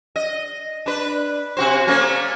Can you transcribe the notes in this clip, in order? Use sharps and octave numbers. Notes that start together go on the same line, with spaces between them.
D#5
D4 B4
C3 F#4 C5
A3 A#3 C#4